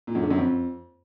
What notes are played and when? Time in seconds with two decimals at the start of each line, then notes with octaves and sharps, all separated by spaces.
0.07 A#2
0.15 F#2
0.23 D3
0.30 F#2
0.38 F2